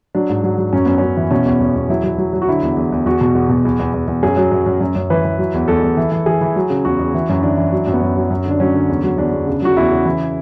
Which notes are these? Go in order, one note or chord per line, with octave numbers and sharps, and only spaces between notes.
F#3 D4
G#2
F#3
F#3
F#2 C#4
F#2 B3
F#2 C#4
E3
B2 C#4
E2
E2
E2
F#3 E4
F#3
F#3
F#3
F#4
D3 E4
E2
E2
E2
E2 F#4
B2
E2
B2
E2
E2
E2
E2
F#2 G#4
F#3
F#2
F#2
F#2
F#2
E3 B4
E3
F#3
E2
E2 A4
E2
E3
E3
E3 G#4
E3
F#3
C#3
E2 F#4
E2
E3
F#2
E3 D4
E3
F#3
F#2
B3
F#2 C#4
F#3
F#2
D3 D4
F#3 C#4
D3
E2
F#3
E2 D4
E2
C#3
F#3 F#4
E2 E4
C#3
E3